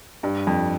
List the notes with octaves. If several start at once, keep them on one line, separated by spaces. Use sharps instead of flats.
G2
F2